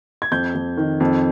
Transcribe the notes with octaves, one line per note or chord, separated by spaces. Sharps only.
G#6
F2 G6
F2
D#3
F2